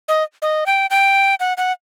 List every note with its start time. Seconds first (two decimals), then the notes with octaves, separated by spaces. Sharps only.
0.08 D#5
0.42 D#5
0.66 G5
0.90 G5
1.40 F#5
1.57 F#5